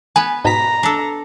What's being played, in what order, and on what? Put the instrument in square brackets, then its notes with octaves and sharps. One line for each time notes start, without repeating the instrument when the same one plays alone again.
[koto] B3 B4 [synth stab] G#5
[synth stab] G#2 B2 B6 [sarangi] A#5
[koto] D4 A4